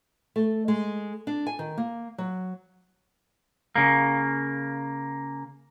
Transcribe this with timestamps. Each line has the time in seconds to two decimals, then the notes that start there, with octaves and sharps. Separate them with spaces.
0.36 A3
0.68 G#3
1.27 D4
1.47 G#5
1.59 D#3
1.78 A#3
2.18 F#3
3.76 C#3 A#3